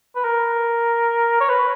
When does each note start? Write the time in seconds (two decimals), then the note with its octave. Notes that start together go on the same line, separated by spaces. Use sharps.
0.15 B4
0.24 A#4
1.40 C#5
1.49 B4